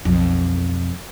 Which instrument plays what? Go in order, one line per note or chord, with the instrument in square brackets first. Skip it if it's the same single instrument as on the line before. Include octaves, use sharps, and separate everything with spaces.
[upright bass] B1 F2